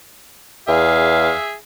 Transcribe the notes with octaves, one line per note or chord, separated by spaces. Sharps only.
E2 G#4 E5 F5